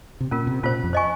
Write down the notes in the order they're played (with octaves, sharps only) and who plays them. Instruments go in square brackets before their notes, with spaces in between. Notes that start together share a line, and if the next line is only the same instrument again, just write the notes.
[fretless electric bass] C3
[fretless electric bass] A#2 [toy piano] C#4 F4 A#4
[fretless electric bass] C3
[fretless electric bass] A#2 [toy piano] C#4 F4 C5
[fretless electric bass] F2
[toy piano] C5 D#5 G#5 C#6